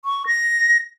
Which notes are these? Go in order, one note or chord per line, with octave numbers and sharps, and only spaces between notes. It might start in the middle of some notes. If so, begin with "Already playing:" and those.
C#6
A#6